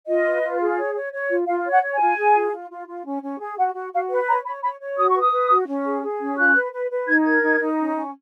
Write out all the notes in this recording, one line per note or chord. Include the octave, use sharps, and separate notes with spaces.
F4 D#5
B4
F4
G#4
C#5
C#5
C#5
F4
F4 F5
C#5
F#5
C#5
G#5
F4
G#4
F4
F4
F4
F4
C#4
C#4
G#4
F#4 F#5
F#4
F#4 F5
B4 F#5
C#5 A#5
C#5 B5
C#5 B5
C#5
F#4 D#6
C#6
B4 D#6
B4
F#4
C#4
G#4
G#4
C#4
F4 F#6
B4
B4
B4
D#4 G#6
A#4 G#6
D#4
D#4
C#4
C#4